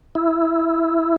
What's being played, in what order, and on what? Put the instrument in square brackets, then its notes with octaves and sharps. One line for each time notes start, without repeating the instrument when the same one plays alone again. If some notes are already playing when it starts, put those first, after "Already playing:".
[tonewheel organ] E4